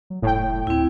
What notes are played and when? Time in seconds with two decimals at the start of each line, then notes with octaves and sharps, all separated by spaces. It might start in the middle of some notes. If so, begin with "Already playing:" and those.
0.10 F#3
0.22 F1 A2 G5
0.67 D2 C4 E4